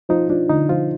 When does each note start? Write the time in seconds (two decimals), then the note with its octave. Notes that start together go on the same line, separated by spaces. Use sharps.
0.09 F3 D#4
0.29 F3 D4
0.49 D3 D#4
0.69 F3 F4